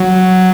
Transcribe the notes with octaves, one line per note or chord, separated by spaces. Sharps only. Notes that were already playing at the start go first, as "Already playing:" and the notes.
Already playing: F#3